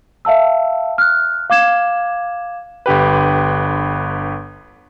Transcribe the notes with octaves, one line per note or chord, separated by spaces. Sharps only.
E5 F5 A5 E6
F6 F#6
F5 D6 G#6 E7
G1 D3 G4 B4